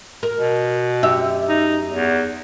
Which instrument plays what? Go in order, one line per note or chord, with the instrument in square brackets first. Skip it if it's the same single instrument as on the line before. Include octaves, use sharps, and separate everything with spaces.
[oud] A#4
[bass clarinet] B2
[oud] F#2 G4 E5
[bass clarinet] D#4
E2